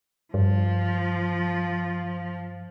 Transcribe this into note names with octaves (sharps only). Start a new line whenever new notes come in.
G2 F3